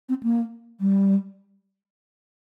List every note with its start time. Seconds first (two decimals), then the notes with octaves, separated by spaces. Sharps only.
0.09 C4
0.23 A#3
0.81 G3